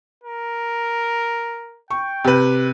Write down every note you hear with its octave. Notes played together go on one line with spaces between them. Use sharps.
A#4
G5 C#6
C3 B4